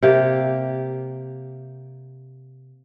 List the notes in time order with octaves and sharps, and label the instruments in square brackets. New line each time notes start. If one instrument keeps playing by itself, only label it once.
[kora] C3 A#3 G4